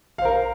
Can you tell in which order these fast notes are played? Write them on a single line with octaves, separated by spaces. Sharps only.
F5 C5 A#4